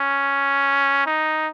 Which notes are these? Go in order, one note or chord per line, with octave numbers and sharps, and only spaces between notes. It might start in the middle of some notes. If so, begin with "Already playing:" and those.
Already playing: C#4
D#4